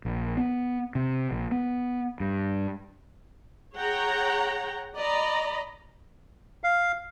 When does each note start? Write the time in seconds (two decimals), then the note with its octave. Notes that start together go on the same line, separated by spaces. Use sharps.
0.05 A#1
0.37 B3
0.95 C3
1.31 A#1
1.51 B3
2.20 G2
3.75 G#4 C#5 F#5 G5 A#5
4.95 D5 D#5 A#5 B5
6.64 F5